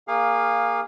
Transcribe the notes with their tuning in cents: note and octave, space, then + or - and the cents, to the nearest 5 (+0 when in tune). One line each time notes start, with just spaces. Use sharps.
A#3 +0 G#4 -25 F5 +10